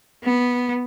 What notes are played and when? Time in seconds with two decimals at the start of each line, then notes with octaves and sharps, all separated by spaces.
0.24 B3